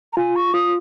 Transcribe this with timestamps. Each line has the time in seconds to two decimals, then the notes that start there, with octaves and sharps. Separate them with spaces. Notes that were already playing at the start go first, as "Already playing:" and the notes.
0.13 A#5
0.17 F4 G#5
0.36 C#6
0.54 F4 D#6